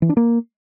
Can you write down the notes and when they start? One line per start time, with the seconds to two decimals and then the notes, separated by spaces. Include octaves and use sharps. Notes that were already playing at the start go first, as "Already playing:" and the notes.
0.02 E3
0.09 D4
0.17 A#3